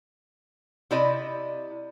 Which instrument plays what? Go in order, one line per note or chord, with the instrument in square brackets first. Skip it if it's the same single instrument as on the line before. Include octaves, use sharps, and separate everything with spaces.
[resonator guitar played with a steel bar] C3 E4 D5 D#5